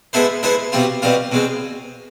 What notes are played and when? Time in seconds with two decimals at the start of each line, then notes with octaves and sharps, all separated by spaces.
0.13 G#3 B3 E4 A4 C5
0.43 G#3 B3 E4 A4 C5
0.72 B2 G3 C4 F4
1.02 B2 G3 C4 F4
1.32 B2 G#3 C4